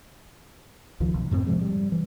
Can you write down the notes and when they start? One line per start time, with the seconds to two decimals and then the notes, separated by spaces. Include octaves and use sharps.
1.00 C#2 D#3 F3
1.14 B1
1.31 F#2 A2 B3 C4
1.47 G#2 C3 F3 G#3
1.61 G3
1.92 E3